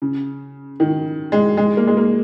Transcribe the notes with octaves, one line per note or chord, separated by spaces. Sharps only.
C#3
D#3
G#3
G#3
A#3
G#3
A#3